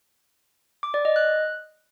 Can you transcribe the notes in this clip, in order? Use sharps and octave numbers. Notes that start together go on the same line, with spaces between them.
D6
D5
D#5
F#6